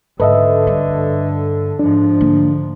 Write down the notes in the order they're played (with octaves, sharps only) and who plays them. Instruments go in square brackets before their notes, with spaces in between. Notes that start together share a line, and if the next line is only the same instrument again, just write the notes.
[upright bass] G#2 G#3 [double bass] D3 [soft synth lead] A4 [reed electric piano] B4 D#5 E5
[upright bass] G2
[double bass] G#2 F3 [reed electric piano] D4
[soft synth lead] D3 [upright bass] A#3